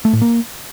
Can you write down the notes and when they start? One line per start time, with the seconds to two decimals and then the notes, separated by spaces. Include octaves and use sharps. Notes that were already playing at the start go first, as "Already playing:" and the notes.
0.05 A3
0.13 A2
0.21 A#3